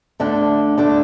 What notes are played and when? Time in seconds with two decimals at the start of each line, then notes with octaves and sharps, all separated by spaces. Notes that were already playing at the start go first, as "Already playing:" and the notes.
0.20 D2 D3 A3 D4
0.78 D2 D3 A3 D4